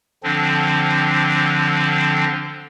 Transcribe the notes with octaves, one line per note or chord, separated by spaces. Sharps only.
D3 F3 C4 D4